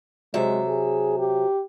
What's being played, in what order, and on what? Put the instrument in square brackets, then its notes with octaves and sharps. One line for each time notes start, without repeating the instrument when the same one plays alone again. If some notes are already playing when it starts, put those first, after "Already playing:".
[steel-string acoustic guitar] C3 F#3 E5 [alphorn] G#3
[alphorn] G#4
G4